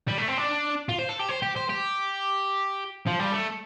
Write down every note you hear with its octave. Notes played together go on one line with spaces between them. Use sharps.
G3
A3
C4
D4
F4
C5
A4
G4
C5
G4
C5
G4
F3
G3
A3